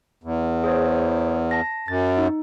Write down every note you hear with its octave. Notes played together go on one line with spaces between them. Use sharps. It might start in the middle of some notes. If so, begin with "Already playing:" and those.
E2
G#4 C5 C#5
A5 A#6
F#2 A6
D#4